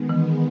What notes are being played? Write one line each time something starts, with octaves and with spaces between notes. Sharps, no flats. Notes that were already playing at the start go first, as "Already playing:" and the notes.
Already playing: D#3 G#3 B3
E3